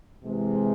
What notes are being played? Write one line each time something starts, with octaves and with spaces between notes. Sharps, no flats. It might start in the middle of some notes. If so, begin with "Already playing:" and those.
C3 E3 G#3 C4